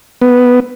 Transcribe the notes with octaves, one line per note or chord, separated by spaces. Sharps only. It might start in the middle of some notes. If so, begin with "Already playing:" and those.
B3